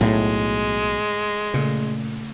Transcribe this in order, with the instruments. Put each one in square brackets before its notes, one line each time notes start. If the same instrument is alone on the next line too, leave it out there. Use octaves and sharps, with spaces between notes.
[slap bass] B1 [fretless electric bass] A2 [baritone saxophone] G#3
[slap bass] A#2 [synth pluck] C#3 A3